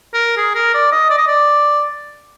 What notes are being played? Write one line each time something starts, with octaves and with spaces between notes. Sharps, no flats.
A#4
G#4
A#4
D5
D#5
D5
D#5
D5